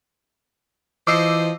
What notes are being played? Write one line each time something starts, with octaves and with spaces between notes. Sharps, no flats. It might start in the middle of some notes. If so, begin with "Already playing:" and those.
E3 F3 C5 D#5 D6 E6 C7